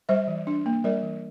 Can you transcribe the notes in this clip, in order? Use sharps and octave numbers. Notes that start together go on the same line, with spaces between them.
G3 C5 E5
E3
D4
A#3
G3 A#4 D5
E3